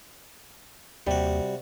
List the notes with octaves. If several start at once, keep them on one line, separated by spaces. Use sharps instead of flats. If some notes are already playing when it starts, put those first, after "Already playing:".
D#2 C3 G3 F#4